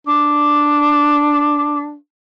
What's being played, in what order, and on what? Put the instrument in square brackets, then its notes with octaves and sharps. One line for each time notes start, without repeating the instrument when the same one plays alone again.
[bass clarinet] D4 [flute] D6